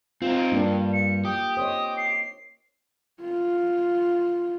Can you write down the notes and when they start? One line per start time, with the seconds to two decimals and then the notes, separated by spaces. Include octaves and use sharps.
0.22 C4 D#4 F4
0.52 G2 A#3 D4
0.93 C#7
1.25 G4 D#6
1.57 C5 C#5 D#5 D#6
1.97 C7
3.21 F4